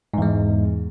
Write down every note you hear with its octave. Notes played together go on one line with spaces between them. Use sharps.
E2 G#2 G#3